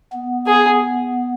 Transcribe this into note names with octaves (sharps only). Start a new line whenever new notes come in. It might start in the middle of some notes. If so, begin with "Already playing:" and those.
B3
G#4